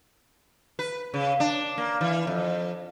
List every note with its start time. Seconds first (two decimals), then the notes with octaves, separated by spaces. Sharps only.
0.79 B4
1.14 C#3
1.40 D4
1.78 A#3
2.01 E3
2.27 F2